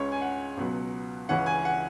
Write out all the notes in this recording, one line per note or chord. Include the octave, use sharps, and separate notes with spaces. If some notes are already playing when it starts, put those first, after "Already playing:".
Already playing: C#2 C#3 G#3 C#4 C#5
G#5
F#5
C#2 B2 F#3 B3
C#2 C#3 E3 C#4 F#5
G#5
F#5